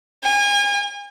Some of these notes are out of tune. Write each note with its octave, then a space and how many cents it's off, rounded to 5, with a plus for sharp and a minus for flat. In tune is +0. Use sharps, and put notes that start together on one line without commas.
G#5 -35